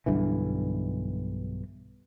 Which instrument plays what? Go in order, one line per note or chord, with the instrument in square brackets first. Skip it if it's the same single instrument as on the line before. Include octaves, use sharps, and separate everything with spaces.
[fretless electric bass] B1 G2 D3 E3